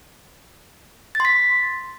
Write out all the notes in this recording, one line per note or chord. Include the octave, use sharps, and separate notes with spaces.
C6 A6 B6